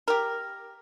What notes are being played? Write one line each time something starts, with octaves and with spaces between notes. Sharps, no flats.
G4 A#4